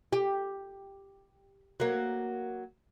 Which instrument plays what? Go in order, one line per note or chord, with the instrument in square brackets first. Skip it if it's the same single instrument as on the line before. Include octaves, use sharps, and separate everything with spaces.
[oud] G4
F#3 A#3